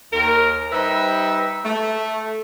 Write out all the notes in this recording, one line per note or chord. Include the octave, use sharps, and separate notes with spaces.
D#2 A#4
G3 D#4 G4 B4 C5 E5
A3